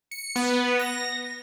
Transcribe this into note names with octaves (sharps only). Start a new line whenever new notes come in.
C#7
B3
A#6